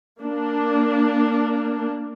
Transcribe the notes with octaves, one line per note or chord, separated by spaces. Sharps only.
A#3 D4